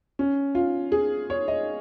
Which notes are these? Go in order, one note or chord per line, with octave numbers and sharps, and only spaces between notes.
C#4
F4
G#4
C#5
D#5